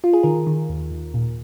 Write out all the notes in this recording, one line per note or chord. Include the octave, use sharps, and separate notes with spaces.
F4
G#4
D#3 A#4
D#3
D#2
D#2
A#2